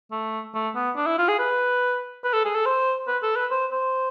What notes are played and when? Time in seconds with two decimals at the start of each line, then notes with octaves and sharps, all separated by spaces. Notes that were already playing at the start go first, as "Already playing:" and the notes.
0.11 A3
0.54 A3
0.75 B3
0.96 D4
1.06 E4
1.18 F4
1.28 G#4
1.39 B4
2.24 B4
2.33 A4
2.45 G#4
2.55 A4
2.66 C5
3.08 B4
3.23 A4
3.36 B4
3.51 C5
3.72 C5